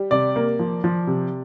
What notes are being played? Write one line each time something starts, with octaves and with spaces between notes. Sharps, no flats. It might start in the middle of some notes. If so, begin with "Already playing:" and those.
Already playing: G3
C3 D5
A#3
F3
F3
C3